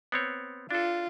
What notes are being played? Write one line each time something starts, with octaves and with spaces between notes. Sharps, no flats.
B3 C4 C#5
D4 F4 A4